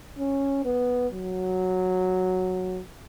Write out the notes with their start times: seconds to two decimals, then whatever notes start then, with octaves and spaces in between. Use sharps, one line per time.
0.19 C#4
0.65 B3
1.12 F#3